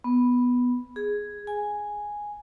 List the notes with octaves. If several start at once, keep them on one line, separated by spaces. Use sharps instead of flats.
B3
G#4
G#5